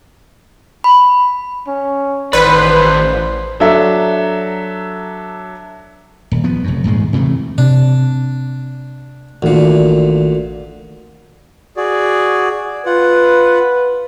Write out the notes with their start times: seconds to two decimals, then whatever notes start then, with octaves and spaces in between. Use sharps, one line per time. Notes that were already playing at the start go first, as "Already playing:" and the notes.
0.84 B5
1.68 C#4
2.33 A1 D#3 B4 C5 D5
3.60 F#3 D4 A4 E5
6.32 D#1
6.44 F3 B3
6.64 F1 F#2
6.84 D#1 G#2 D#3 G#3
7.13 C3 E3 F#3 A3
7.58 C3 D4
9.42 A1 D2 A#2 D#3
11.77 F#4 G#4 D5
12.86 F4 B4 F#5